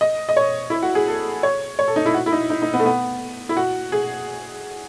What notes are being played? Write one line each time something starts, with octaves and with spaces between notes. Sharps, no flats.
D#5
D#5
C#5
E4
F#4
G#4
A4
C#5
C#5
A4
D#4
E4
F#4
E4
D#4
D#4
D#4
B3
A3
B3
E4
F#4
G#4